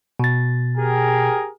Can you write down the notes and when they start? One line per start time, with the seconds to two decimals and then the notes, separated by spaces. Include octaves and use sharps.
0.20 B2 A6
0.77 G4 G#4 A#4